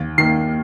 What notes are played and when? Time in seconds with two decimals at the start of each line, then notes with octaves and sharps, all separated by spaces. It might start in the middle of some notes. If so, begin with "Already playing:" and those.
Already playing: D#2
0.18 D#3 A#3 C7